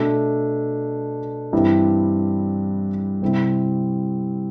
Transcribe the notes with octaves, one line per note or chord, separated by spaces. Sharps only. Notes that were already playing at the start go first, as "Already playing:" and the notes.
Already playing: B2 A3 D4
G2 E3 G3 C4 E4
C3 G3 C4 E4